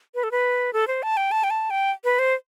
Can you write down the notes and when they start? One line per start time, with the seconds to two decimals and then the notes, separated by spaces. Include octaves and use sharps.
0.15 B4
0.23 A4
0.31 B4
0.73 A4
0.87 C5
1.03 A5
1.17 G5
1.32 A5
1.44 G5
1.50 A5
1.70 G5
2.04 B4
2.19 C5